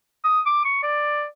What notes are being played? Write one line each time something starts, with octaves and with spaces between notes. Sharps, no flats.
D#6
D6
C#6
D5